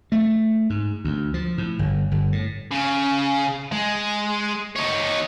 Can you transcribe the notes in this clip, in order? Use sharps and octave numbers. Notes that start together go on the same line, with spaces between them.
A3
G#2
D2
F3
A2
G1
G1
A2
C#3
G#3
D#4 C#5